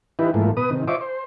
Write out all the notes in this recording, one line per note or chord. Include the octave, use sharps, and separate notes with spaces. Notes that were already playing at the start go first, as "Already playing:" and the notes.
E3 D#4 E4 G4 B4
G#2 E3 F3 A3 A#3
B2 B4 D#6
C3 D#3
F4 C5 C#5 D#5 E5 D6
C5